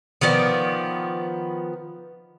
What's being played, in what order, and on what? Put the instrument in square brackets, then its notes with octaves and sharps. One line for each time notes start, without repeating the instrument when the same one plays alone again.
[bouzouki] D#3 F3 B3 D5